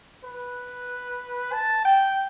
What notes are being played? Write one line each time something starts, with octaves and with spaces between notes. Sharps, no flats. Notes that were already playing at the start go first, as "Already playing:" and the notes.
B4
A5
G5